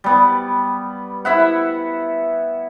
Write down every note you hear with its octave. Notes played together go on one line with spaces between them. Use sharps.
G3 B3
E4 E5 F#5